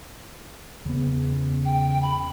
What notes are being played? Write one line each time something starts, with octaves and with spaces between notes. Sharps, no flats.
E2 C#3 B3
G5
B5